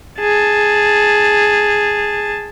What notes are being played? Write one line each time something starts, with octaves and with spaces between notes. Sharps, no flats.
G#4 A5